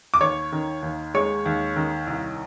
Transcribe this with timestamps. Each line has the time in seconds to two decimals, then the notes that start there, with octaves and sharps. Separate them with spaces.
0.14 D6
0.21 D#2 C#5 C#6
0.52 D#3
0.83 D#2
1.14 G#3 C#5 C#6
1.46 D#2
1.76 D#3
2.07 C2